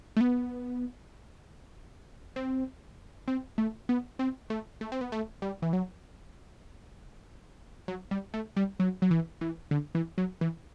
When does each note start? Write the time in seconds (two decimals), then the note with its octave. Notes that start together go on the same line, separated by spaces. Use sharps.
0.17 A3
0.21 B3
2.36 C4
3.28 C4
3.58 A3
3.89 B3
4.19 C4
4.50 A3
4.81 A3
4.92 C4
5.01 B3
5.12 A3
5.42 G3
5.62 E3
5.73 F#3
7.88 F#3
8.11 G3
8.34 A3
8.57 G3
8.80 F#3
9.02 F#3
9.11 E3
9.41 E3
9.71 D3
9.95 E3
10.18 F#3
10.41 E3